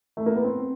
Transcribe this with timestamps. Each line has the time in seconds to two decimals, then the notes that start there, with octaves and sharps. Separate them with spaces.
0.17 A3
0.26 A#3
0.35 B3
0.44 C4